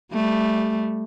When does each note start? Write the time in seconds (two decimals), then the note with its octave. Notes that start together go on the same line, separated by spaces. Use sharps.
0.13 G3 A3